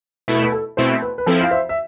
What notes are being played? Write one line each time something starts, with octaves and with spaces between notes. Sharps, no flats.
B2 A3 E4 B4
A4
B4
A4
B2 A3 C4 E4 A4 C5
B4
B4
F3 C4 E4 A4 C5
F5
C5 E5
E5